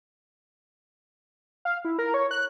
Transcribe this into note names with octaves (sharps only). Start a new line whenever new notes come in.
F5
E4
A#4
C#5
F#6